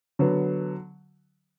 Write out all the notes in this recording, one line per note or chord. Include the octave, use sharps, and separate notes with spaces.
D3 F#3 B3